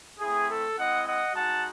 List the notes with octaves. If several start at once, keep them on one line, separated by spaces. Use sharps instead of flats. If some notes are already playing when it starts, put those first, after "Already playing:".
A3 C4 E4 G#4
A4
G#3 C4 E4 D#5 F#5
D#5 F#5
G#3 D#4 F#4 F#5 A5